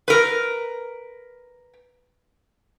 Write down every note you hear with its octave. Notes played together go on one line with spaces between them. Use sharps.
A#4 B4